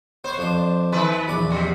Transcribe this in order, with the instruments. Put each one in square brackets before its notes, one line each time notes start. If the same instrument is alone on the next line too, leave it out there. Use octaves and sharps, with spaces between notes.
[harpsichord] B3 C#5 [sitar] C5
[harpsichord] F2 D4
[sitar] D#3 B4
[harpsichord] A#1 E2 D5
[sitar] C3 F#3